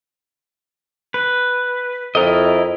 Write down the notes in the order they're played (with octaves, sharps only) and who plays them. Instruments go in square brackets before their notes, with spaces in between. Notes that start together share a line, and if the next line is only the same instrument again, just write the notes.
[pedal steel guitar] B4
[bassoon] F2 [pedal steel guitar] E4 A#4 D#5